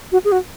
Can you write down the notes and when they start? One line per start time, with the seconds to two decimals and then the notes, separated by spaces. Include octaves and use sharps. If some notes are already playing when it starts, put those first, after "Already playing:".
0.12 F#4
0.24 G#4
0.32 F#4